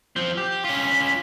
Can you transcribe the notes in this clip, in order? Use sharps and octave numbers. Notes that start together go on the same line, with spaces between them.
F3 C4
G4
C#4 F4 B6